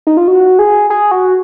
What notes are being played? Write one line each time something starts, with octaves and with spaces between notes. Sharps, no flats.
D#4
F4
F#4
G#4
G#4
F#4